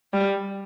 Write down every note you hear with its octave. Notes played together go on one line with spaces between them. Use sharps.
G3